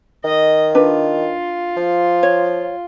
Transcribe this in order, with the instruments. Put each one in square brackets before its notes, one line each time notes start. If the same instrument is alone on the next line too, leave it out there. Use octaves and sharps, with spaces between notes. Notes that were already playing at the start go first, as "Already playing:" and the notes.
[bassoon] D#3 [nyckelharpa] D#5
[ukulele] D4 B4 [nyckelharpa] F4
[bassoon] F3
[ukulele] C#5